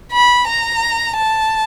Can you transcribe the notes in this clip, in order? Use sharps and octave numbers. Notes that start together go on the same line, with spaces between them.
B5
A#5
A5